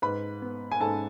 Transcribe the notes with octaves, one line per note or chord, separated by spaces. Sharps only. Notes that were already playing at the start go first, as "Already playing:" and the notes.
G#2 B4 B5
B3
G#5
G#2 A4 A5